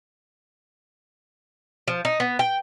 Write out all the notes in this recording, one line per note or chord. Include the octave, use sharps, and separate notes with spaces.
F3
D#4
B3
G5